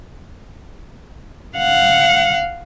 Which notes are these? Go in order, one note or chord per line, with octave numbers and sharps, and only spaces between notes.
F5 F#5